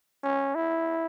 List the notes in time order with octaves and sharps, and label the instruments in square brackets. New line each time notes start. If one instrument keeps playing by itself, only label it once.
[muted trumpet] C#4
E4